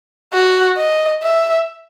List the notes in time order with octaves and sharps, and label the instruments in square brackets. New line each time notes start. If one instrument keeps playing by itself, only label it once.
[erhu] F#4
D#5
E5